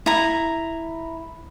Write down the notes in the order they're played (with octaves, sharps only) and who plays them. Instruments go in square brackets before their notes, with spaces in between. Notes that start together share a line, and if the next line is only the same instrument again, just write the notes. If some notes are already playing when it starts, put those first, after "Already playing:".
[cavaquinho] E4 A#5